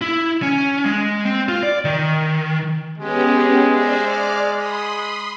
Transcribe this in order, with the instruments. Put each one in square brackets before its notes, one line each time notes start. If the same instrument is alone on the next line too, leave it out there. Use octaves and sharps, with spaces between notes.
[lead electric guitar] E4
C#4
G#3
C4
F4
D5
D#3
[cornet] G#3 [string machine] B3 C#4 G4
[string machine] C5 D5 E5
D5 D6 F6
B5 C6 D#6